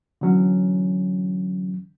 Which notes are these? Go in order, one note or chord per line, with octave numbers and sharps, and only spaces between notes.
D3 E3 F#3 C#4